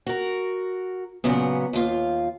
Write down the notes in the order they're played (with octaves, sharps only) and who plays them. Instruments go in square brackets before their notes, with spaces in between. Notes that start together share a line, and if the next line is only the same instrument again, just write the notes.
[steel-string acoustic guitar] F#4 A#4
A#2 C#3 F#3 B3
D#2 F4 F5